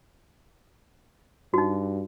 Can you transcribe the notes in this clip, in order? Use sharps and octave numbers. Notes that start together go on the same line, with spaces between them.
G2 D#4 F#4